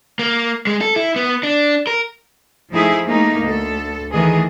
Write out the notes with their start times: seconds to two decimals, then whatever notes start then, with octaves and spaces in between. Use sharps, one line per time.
0.19 A#3
0.67 G#3
0.81 A4
0.96 E4
1.16 B3
1.43 D4
1.87 A#4
2.72 F3 A3 D#4 E4 G#4
3.05 A3 A#3 D#4
3.42 D2 A4
4.13 D#3 E3 A3 G#4 D#5